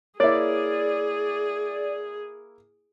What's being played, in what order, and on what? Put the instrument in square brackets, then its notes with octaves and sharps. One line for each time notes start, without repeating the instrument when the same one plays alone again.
[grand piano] A#3 E4 [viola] G#4 [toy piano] C#5 [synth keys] D5